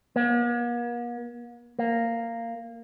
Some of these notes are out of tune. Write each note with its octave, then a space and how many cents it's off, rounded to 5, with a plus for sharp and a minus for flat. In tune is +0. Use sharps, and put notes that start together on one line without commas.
A#3 +45
A#3 -15